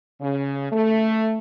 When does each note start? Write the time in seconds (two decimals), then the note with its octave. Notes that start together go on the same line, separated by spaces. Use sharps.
0.21 C#3
0.71 A3